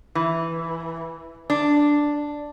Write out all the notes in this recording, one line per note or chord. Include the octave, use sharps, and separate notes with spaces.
E3
D4